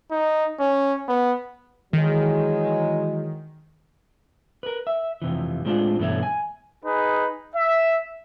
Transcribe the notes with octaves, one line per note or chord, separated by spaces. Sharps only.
D#4
C#4
B3
D#3 E3 F#3 G#3
A#4 B4
E5
F2 C3 E3
A2 G#3 C4 D4 F4
G2 B2 E3 A3 E4 C#5
G#5
D#4 G#4 B4
E5